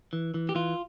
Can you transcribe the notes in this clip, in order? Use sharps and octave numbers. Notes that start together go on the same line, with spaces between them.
E3
E3
G4
E3 F4